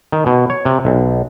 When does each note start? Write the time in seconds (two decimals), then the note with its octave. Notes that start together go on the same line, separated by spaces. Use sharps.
0.12 D#3
0.26 B2
0.50 C#5
0.65 C3
0.85 B1